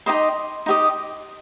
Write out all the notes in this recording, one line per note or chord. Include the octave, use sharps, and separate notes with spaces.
D#4 G4 C5 D#5 C6
D#4 G4 C5 D#5